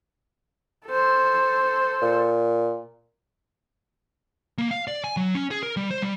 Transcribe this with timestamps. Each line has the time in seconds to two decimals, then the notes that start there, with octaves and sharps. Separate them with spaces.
0.86 A4 C5
2.02 A#2
4.58 A#3
4.71 F5
4.88 D5
5.04 G#5
5.17 F#3
5.35 C#4
5.51 G#4
5.63 A#4
5.77 G3
5.91 C5
6.02 G3